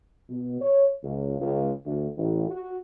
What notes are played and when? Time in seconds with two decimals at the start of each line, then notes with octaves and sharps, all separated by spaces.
0.29 B2
0.61 C#5
1.03 C#2
1.40 C#2
1.85 D2
2.17 A1
2.49 F#4